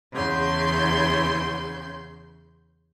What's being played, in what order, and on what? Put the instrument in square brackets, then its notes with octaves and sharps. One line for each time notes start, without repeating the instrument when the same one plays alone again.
[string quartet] E2 C#3 C6 G6